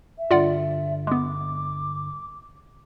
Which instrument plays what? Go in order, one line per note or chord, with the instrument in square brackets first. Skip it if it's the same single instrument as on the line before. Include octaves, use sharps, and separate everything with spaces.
[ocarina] E5
[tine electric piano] G2 D3 [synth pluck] F4 D5 F#5
[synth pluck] G#3 B3 [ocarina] D6